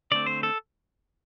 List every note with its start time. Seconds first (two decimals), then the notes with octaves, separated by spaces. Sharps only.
0.11 D3 A3 C4 D5
0.26 C5
0.43 A4